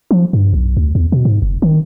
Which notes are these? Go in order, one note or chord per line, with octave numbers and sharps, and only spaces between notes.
F3
G2
B1
D2
E2
B2
G#2
F#1
D#3